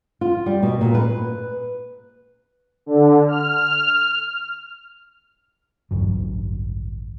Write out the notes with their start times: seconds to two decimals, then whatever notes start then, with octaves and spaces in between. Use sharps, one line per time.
0.21 F4
0.46 G3
0.63 B2
0.81 A#2
0.94 B4
2.86 D3
3.28 F6
5.91 A1 D2 G2 F#3